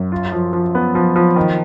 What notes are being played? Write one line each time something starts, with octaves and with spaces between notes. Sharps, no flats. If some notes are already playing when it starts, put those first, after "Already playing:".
Already playing: F#2
F4
F3
F3
B3
F3
F3
D#3